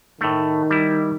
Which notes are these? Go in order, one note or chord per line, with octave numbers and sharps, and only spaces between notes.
A2 D#3 A3
G3 E4